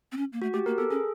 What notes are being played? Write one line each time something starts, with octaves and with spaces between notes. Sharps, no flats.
C4
C#4
A#3
A3 F#4
A3 G4
A#3 A#4
B3 A4
C#4 G#4